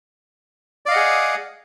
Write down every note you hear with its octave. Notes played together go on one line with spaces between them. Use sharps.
G#4 D5 D#5 F5 F#5